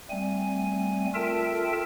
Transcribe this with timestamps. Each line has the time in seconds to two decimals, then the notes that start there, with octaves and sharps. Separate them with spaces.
0.10 G3 A3 C4 G#5
1.15 F4 A4 A#4 E5 G5 A5